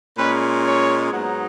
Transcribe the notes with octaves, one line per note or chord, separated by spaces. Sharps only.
A#2 G#3 C#4 B4
C#5
G#2 F#3 B3 D#4